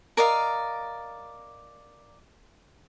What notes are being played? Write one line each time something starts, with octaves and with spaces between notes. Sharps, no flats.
A#4 D5 D#5 F5